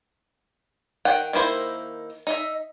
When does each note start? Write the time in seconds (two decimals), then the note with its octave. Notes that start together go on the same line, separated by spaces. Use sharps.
1.05 D#3 F#5 G5
1.33 D#3 A#3 E4 C5
2.27 D#4 D#5 E5